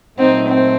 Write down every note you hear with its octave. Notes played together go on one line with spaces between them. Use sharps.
A#2 F#3 A3 C4 D#4
C4